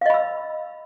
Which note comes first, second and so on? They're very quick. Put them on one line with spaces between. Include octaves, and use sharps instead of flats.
F5 D#5 B5 E6